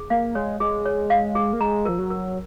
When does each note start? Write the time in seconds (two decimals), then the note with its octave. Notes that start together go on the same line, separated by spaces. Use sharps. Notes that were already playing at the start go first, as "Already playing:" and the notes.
Already playing: G#4
0.10 A#3 F5
0.35 G#3 C#5
0.60 G#3 G#4
0.85 C#5
1.10 F5
1.35 G#4
1.53 A#3
1.60 G#3 A#5
1.85 F3 A#4
1.98 F#3
2.10 A#4